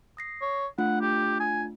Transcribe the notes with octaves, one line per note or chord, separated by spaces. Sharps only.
D#6 A#6 C7
C#5
A3 D4 F4 F#5
G4
G#5